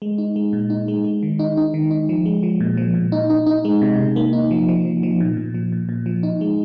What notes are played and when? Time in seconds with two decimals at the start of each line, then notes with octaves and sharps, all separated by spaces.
0.02 G#3
0.18 D#4
0.36 G#3
0.53 A#2
0.70 D#4
0.88 G#3
1.05 G#3
1.23 D#3
1.39 D#4
1.57 D#4
1.74 D#3
1.91 D#4
2.09 F3
2.26 G#3
2.43 F3
2.60 A#2
2.77 F3
2.95 A#2
3.12 D#4
3.30 D#4
3.47 D#4
3.65 G#3
3.81 C3
3.98 C3
4.16 A#3
4.33 D#4
4.51 F3
4.68 F3
4.85 F3
5.03 F3
5.21 A#2
5.37 A#2
5.54 F3
5.72 A#2
5.89 A#2
6.06 F3
6.23 D#4
6.41 G#3